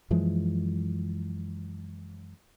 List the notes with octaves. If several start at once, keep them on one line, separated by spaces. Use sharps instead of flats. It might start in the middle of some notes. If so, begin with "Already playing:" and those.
F#2 E3 F3 G#3